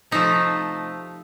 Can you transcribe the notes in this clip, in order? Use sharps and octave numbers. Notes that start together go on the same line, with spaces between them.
C3 F3 A3 D#4